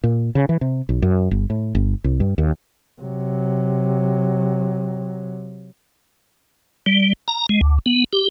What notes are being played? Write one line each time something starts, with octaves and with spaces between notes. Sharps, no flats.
A#2
C#3
E3
C3
B1
F#2
G1
A2
G1
C2
G2
D#2
C3 F#3
G3
A#5
G#3
D2
B3
G4